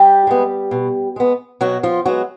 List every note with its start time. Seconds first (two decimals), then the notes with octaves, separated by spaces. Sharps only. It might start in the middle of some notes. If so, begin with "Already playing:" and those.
Already playing: G3 G4
0.27 G#3 B3
0.71 B2
1.16 G#3 B3
1.61 B2 F#3 F#4
1.83 F3 F4
2.06 F#3 G#3 B3 F#4